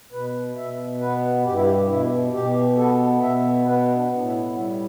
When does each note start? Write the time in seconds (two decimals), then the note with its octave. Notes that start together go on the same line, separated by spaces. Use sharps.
0.12 B2 B4
0.56 B2 E5
1.00 B3 B4
1.45 G2 G4
1.54 E4
1.62 G4
1.88 B2 E4
2.33 B2 G4
2.77 B3 A4
3.21 B2 E5
3.65 B3 B4
3.95 D4
4.10 A2
4.24 E4
4.54 G3 E4